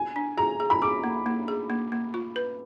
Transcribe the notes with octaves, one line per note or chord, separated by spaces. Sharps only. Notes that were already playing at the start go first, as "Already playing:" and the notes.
Already playing: G#5
D4
G#4 A#5
G#4
B5
G#4 D6
A#3
A#3
G#4
A#3
A#3
F4
B4